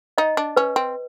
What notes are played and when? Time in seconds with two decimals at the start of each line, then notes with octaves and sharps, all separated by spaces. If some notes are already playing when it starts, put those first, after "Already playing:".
0.18 D#4 D#5
0.37 D4
0.56 C#4 B4
0.76 C4